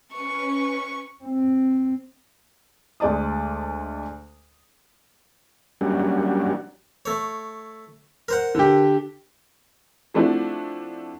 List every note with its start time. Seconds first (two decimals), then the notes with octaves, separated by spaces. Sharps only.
0.12 C#4 B4 C#6
1.23 C4
3.00 D2 G#3 D5 A5 D#6
5.81 F#3 G3 A#3 C#4 D4 F#4
7.06 A3 C#5
8.28 A#4 C5 F#5
8.55 D3 G4
10.14 F3 A3 C4 D4 E4 F#4